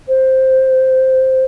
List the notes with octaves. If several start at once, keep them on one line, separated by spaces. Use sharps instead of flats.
C5